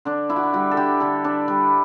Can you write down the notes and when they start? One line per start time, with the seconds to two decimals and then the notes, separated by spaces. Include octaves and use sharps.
0.05 D3 D4
0.29 D4 E4
0.36 F#4
0.43 E4
0.53 G3 F#4
0.71 A4
0.77 D3 G4
1.00 D3 A4
1.24 D4 B4
1.48 G3 B4